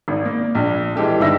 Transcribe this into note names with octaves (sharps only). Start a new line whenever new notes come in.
G#1
A#3
A#1
E3 G#3 G4 A4
G1 G2 D#3 E5 E6 A#6